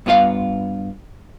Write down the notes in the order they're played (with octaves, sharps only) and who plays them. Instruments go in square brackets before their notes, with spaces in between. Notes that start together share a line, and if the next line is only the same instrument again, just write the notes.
[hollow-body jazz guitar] G2 B3 F4 B4 F5